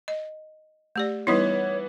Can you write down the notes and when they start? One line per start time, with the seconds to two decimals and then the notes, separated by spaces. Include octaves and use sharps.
0.08 D#5
0.96 A3 G4 D5
1.27 E3 G3 B3 D#4 E4 C#5